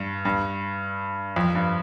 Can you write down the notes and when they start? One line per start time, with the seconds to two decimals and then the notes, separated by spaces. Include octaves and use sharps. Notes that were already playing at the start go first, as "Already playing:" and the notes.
Already playing: G2
0.25 G2
1.36 F2
1.55 G2